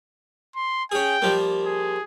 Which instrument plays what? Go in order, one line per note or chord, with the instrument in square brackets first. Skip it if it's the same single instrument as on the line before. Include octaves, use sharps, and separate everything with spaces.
[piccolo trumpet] C6
[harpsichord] C#4 G#4 [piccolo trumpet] G5
[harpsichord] F3 G3 A#3
[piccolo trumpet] G#4